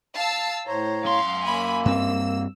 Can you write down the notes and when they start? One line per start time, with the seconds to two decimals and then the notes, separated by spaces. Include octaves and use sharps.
0.14 F5 A5 E6
0.67 A2 C5 C#5 A#5
1.05 F#2 F5 C6
1.45 A#3 G#5 B5
1.85 G2 C4 E6